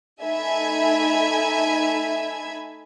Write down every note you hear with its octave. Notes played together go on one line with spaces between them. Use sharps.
A3 D#4 E5 G#5 B5 G#6